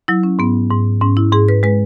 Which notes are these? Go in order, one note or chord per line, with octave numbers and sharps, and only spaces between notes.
F#3 E4
C#4
G#2 B3
G#2
G#2 C#4
E4
G#2 G#4
B4
G#3 B4